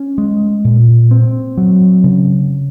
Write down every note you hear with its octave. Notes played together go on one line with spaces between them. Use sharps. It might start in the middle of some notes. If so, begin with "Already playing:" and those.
Already playing: C#4
G#3
A#2
C4
F#3
C#3